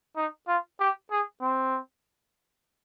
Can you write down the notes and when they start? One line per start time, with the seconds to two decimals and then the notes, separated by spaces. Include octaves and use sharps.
0.16 D#4
0.48 F4
0.80 G4
1.11 G#4
1.41 C4